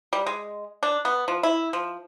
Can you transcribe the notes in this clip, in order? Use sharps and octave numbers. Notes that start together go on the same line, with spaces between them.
G3
G#3
D4
B3
F3
E4
F3